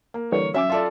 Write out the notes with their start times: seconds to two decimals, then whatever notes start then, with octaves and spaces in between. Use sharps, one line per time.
0.14 A#3
0.32 D3 E3 G3 C#5
0.54 F#3 C#4 E5 D6 E6
0.70 F4 A4 D5